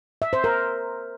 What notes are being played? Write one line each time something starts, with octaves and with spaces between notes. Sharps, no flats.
E5
C5
A#4